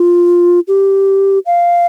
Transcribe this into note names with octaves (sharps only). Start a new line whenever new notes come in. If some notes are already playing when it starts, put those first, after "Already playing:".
Already playing: F4
G4
F5